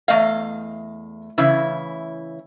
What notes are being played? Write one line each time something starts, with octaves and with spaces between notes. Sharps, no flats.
E2 A3 D#5 F5
C#3 E3 E4